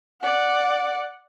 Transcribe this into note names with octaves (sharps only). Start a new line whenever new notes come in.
D5 F#5